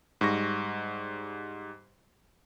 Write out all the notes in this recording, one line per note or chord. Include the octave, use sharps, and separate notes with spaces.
G#2 G3 C#6 A#6